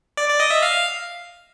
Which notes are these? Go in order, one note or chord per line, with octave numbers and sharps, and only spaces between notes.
D5
D5
D#5
E5
F5